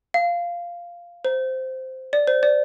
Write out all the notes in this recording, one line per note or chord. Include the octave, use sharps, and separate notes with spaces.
F5
C5
D5
C5
D5